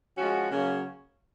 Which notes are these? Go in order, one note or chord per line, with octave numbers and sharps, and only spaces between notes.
F3 G#3 C#4 F#4
C#3 F#3 A#3 C#4